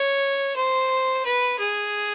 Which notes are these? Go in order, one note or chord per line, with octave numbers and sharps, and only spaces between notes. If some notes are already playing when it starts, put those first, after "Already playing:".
Already playing: C#5
C5
B4
G#4